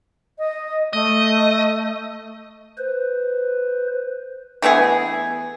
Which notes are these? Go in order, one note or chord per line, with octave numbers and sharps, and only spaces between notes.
D#5
A3 D#5
B4 C5
E3 A3 B3 G#4